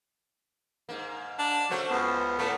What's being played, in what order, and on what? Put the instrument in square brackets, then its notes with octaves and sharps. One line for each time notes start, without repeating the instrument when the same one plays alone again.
[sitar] G#2 A#3
[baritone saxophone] D4
[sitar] C#3 A3 C5 [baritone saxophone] F#3
[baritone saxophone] C#2 [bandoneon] B3
[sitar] A2 A#3 [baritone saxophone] A3